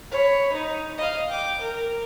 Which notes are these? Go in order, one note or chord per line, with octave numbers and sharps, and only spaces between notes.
C#5 B5
D#4
D#5 F5
G5 D6
A#4